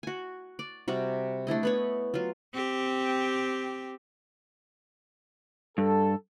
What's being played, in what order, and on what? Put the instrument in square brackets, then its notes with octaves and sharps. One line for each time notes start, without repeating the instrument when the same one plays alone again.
[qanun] F#4 G#5
D5
C3 G3 F#4
A3 D4 E4 D#5
B3 B4 C#5
F#3 F4
[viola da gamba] C4 G4
[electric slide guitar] G2 [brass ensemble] A4